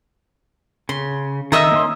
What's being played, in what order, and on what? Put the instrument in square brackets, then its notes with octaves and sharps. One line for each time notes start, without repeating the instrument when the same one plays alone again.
[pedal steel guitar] C#3 [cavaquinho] C6
[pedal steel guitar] D#3 E6 [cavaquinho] D#5 E5 A#5
[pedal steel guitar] A#3 C#4 C6